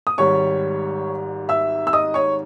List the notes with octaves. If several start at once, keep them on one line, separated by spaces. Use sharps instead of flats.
D#6
G#1 G#2 G3 C#5 C#6
E5 E6
E6
D#5 D#6
C#5 C#6